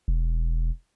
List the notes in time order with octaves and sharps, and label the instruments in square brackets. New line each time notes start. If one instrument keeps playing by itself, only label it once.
[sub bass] E1